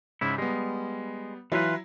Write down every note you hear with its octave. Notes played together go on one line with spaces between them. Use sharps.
G#2 C#3 E4
G3 G#3 B3
E3 F#3 E4 F4 B4